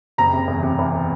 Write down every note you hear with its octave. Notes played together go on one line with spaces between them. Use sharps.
F#1 A#5
C3
E2
C3
E2